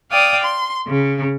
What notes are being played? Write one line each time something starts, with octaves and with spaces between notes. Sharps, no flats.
D5 F5 G5 D#6
C6
C#3